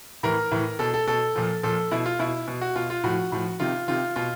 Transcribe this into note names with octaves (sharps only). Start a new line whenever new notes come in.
A2 E3 A#4
A2 E3
B2 A4
A4
B2 A4
A#2 F3
A#2 F3 A4
B2 E4
F4
B2 E4
B2
F#4
B2 F4
F4
A2 F3 F#4
A2 F3
C3 D#3 F4
C3 D#3 F4
B2 F4